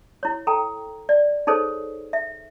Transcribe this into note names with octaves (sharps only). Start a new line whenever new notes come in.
E4 C#5
A4 G5 A#5
D5
D#4 G#4 A4 C5 C#5
E5